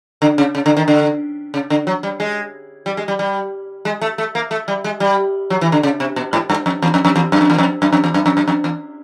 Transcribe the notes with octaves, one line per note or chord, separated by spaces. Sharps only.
D3
C#3
C#3
D3
D#3
D3
C#3
D3
F#3
G3
G#3
G3
G#3
G3
G3
G#3
A3
A3
A#3
A3
G3
G#3
G3
F#3
E3
D3
C#3
C3
B2
G#2
G2
F2
E2
F2
F2
E2
F#2
F2
E2
F2
F#2
F2
E2
F#2
F2
F#2
F2
E2